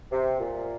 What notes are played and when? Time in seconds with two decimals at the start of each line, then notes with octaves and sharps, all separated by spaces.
0.12 C3
0.40 A#2